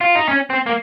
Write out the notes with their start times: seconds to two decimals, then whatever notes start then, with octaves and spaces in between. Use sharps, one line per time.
0.01 F4
0.15 D#4
0.28 C#4
0.50 C4
0.66 A#3